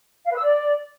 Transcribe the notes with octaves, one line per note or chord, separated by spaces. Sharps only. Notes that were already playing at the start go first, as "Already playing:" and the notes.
F5
B4
E6
D5